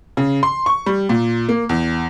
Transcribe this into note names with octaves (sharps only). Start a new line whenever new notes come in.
C#3
C6
C#6
G3
A#2
A#3
E2